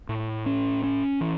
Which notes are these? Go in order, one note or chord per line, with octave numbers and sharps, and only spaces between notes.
A2
C#4
C#4
E3